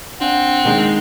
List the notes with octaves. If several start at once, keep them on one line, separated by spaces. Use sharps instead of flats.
C4 D4 F5 F#5 G#5
D#3 G#3